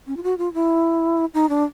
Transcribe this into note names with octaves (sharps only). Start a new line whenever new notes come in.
C#4
F4
F#4
F4
E4
D#4
D4